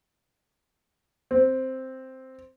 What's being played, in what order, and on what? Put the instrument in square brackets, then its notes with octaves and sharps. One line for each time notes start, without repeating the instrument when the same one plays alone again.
[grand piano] C4